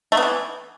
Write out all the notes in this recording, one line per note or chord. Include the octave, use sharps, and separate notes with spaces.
A3
B3
E3